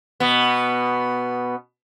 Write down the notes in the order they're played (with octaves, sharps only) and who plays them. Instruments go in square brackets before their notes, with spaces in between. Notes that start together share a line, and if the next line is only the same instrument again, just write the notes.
[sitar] B2 B3